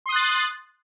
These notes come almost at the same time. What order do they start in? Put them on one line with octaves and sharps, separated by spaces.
C6 D#6 F#6 A6